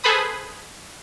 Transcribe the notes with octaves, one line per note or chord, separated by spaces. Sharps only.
G#4 A4 B4 C5 B5 D#6